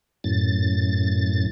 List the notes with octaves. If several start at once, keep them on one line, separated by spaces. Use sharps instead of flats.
F#2 A2 A6